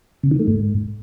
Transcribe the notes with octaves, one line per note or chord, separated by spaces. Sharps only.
C#3
D#3
A3
G#2